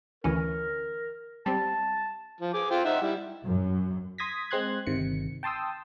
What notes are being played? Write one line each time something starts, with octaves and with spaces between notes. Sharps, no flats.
D2 E3 C#4 A#4
G3 C4 A5
F3
G#4 D6
F4 C5 G5
D#4 E5 F#5
G3 E4
F#2
C6 D#6 G#6 A#6 B6
G#3 C4 C6 F#6 G#6
G1 C3 D#3 C#7
G5 A5 C6 D#6 E6